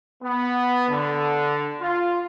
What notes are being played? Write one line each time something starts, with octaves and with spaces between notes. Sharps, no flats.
B3
D3
F4